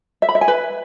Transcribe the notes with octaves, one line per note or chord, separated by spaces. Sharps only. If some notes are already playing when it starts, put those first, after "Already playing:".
E5
B5
E5
G#5
B4